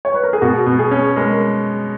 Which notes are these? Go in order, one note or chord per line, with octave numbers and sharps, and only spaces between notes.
C#5
B4
A#4
G#4
B2 F#4
B2
G#4
C#4
G#3 A#4